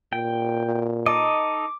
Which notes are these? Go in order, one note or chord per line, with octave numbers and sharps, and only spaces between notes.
A#2 G5
D#4 A4 D#5 D6